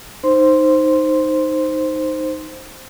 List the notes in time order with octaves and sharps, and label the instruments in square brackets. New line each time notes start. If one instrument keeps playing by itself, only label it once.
[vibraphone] D#4 C5 C6